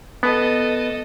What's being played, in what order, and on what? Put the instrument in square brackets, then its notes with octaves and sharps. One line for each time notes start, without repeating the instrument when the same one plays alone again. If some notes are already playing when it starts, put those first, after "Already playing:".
[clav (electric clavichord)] B3 [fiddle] A4 D#5